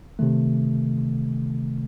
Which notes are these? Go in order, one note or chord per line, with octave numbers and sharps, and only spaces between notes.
C3 D#3 A3